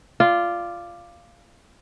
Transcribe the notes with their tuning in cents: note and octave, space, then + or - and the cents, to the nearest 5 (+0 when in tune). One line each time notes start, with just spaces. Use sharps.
F4 -10 D5 +10